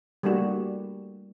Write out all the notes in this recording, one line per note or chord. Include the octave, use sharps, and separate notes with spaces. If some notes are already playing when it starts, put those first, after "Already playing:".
G3 A3 A#3 D4 F#4